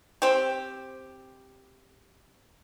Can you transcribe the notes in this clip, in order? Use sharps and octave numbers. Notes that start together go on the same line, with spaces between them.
C4 G4